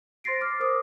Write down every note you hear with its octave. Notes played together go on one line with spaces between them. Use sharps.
C5 C6 A6 A#6 C7 D7
D6 F6
A#4 C5 D6 D#6